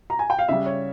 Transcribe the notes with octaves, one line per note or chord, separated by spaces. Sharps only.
A#5
G#5
G5
F5
C#3 G3 E5
C#5